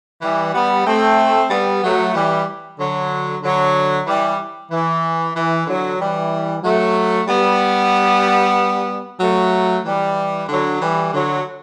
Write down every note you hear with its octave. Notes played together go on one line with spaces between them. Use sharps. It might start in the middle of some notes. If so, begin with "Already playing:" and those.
E3 G3
G3 B3
A3 C4
G3 B3
F#3 A3
E3 G3
D3 F#3
D3 F#3
E3 G3
E3
E3
D3 F#3
E3 G3
F#3 A3
G3 B3
F#3 A3
E3 G3
D3 F#3
E3 G3
D3 F#3